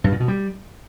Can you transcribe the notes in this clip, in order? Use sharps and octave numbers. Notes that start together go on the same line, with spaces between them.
G2
A#2
B2
G3